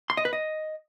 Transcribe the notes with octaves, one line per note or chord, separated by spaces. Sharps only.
C6
D#5
B4
D#5